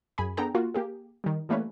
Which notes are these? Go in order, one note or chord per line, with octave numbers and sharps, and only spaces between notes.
F#2 G#4 G#5 B5
B3 D4 G#4 A4 G5 A#5
A#3 F4 F#4
A#3 G4 G#4
D#3 G3
E3 G3 A3 A#3 C#4 B4